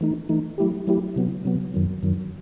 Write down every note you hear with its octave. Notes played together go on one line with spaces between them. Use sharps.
E3 A3 D#4
E3 A3 D#4
F#3 A3 E4 G4
F#3 A3 E4 G4
C3 F#3 B3
C3 F#3 B3
F#2 D#3 F#3
F#2 D#3 F#3